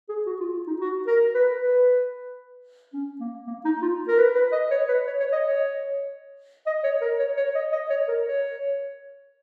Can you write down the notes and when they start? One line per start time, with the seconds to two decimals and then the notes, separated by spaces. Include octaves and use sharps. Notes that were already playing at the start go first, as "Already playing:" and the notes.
0.09 G#4
0.27 F#4
0.40 F4
0.54 F4
0.67 D#4
0.81 F#4
1.07 A#4
1.34 B4
1.61 B4
2.93 C#4
3.20 A#3
3.47 A#3
3.65 D#4
3.82 F4
4.08 A#4
4.18 B4
4.35 B4
4.52 D#5
4.71 C#5
4.88 B4
5.07 C#5
5.20 C#5
5.32 D#5
5.46 C#5
6.67 D#5
6.84 C#5
7.01 A#4
7.19 C#5
7.37 C#5
7.55 D#5
7.72 D#5
7.90 C#5
8.08 A#4
8.25 C#5